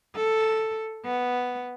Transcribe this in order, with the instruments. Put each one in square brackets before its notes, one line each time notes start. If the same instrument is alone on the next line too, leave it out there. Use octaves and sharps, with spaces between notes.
[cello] A4
B3